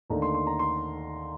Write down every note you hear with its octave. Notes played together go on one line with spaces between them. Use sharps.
D#2 D3 A3 D#4 A#5
C6
C6
A#5
C6